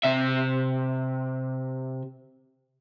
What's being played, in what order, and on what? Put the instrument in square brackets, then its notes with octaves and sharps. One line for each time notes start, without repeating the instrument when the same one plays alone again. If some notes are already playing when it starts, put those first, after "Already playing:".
[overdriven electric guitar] C3 E5